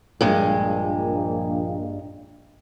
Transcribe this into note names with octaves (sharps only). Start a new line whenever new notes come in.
A#1 G2 G#3 A#3